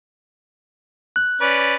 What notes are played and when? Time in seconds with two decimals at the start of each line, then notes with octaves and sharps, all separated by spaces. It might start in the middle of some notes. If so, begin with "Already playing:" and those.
1.16 F#6
1.41 C#4 B4 D5